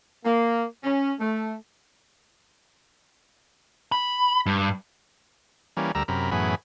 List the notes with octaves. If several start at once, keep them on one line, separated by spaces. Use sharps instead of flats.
A#3
C#4
A3
B5
G2
E3 G3 A#3 C#4
D2 G3 A#4 A#5 E6
F#2 C3 A#4 B5
F#2 A2 E3 B3 G#4 B5